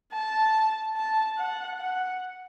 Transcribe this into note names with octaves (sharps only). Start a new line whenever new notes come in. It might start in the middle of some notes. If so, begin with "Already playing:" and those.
A5
A5
F#5
F#5